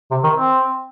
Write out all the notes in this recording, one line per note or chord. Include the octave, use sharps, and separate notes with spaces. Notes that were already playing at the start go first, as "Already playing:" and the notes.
C3
D#3
C4